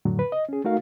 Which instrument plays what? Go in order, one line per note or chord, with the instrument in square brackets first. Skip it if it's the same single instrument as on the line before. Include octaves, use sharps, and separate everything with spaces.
[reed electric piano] F2 A2 D3 F#3
B4
D#5
C#4 G#4
A3 D#4 F#4 A#4 F5